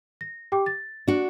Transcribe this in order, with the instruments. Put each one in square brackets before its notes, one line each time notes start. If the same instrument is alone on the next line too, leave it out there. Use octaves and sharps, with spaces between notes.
[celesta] A#6
G4 G5 D6
A6
[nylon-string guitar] D4 F#4